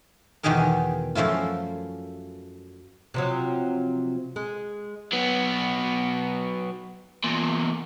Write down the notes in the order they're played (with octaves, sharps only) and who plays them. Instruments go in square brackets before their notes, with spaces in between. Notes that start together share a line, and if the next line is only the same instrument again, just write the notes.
[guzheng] E2 B2 D#3 G4 G#4 A#4
F#2 F3 A3 E4 F4
[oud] C3 F3 F#3
G#3
[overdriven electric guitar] F#3 B3
E2 A#2